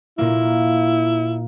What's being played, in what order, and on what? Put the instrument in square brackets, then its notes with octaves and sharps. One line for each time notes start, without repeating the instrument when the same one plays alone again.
[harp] A#2 A#3 [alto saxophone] E4